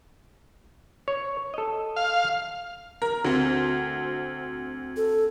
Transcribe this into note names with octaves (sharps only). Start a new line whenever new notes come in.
C#5
A4 D#5
F5
A#4
D2 C4
A4